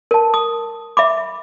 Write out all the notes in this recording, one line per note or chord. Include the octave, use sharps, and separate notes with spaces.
A#4 A5
D#6
E5 B5 D6